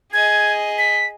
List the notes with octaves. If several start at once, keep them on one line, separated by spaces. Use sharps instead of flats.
G#4 D#5 G#6
B6